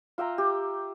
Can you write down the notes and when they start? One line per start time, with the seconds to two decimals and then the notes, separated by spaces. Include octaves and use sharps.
0.18 F4 E5 G5 A#5
0.38 G4